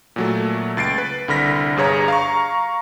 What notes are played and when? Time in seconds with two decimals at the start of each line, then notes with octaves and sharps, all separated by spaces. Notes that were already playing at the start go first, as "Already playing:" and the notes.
0.16 A#2 F#3 A3
0.77 C#2 A6 C7 D7
0.98 B4
1.28 C2 D3 B5 F6 A#6 B6
1.76 G1 G2 G#4 C#5 A#5
2.08 F5 A#5 C#6